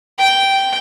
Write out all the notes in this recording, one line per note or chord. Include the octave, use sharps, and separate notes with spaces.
G5